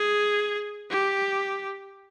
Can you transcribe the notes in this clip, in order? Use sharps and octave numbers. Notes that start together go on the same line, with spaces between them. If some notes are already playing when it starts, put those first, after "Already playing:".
Already playing: G#4
G4